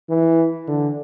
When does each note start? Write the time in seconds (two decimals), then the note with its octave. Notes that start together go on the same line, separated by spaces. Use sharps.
0.09 E3
0.67 D3